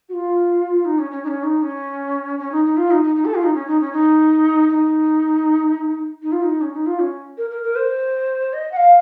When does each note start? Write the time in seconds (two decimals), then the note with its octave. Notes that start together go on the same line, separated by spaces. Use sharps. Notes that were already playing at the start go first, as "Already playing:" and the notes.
0.08 F#4
0.12 F4
0.84 D#4
0.98 C#4
1.11 C#4
1.23 D#4
1.27 C#4
1.43 D#4
1.62 C#4
2.39 C#4
2.51 D#4
2.64 D#4
2.76 F4
2.90 D#4
3.03 D#4
3.15 D#4
3.25 A4
3.34 F4
3.43 D#4
3.53 C#4
3.66 D#4
3.80 C#4
3.92 D#4
4.69 D#4
6.22 D#4
6.32 F4
6.42 D#4
6.61 C#4
6.73 D#4
6.86 F4
6.99 C#4
7.37 A#4
7.50 A#4
7.63 A#4
7.75 C5
8.52 D#5
8.71 F#5
8.76 F5